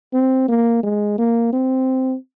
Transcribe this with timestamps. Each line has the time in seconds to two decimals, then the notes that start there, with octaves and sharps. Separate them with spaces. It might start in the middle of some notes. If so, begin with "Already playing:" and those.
0.13 C4
0.49 A#3
0.83 G#3
1.19 A#3
1.53 C4